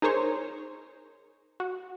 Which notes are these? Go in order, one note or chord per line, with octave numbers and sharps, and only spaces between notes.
D#4 G#4 A#4 C5 C#5
F#4